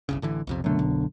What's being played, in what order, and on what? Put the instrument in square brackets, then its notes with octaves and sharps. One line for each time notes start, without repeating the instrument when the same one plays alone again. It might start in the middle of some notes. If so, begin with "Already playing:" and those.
[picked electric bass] G1 C2 C#3
A1 D3 E3
B1 F2 C3
[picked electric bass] C2 A3 [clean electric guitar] F#2 B2 D3
[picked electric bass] B1